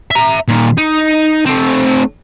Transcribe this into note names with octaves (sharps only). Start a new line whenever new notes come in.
E5 A#5
A#2 D#3
D#4
A3 C4